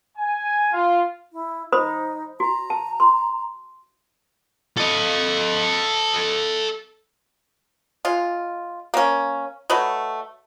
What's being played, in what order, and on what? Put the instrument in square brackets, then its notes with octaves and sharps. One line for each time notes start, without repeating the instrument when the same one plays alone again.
[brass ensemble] G#5
F4
[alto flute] E4
[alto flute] D#4 [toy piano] C5 B5 D#6
[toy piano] F#4 [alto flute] A#5
[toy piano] A5
C6
[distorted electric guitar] A4 D#5
[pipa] G#3 F4
A#3 C#4
F#3 A3 B4 D#5